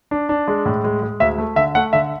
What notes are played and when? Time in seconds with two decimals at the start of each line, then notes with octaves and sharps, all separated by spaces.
0.11 D4
0.29 D4
0.48 G#3
0.66 A2
0.84 G#3
1.02 G#3
1.20 D2 E5
1.38 A3
1.56 D3 E5
1.75 A3 F#5
1.93 D3 E5